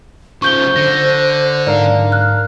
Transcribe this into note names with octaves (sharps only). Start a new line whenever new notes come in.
C#3 F3 C5 C#6 G6 G7
D3 A#6
G#2 D4 A#4 D5 F5
F6 F#6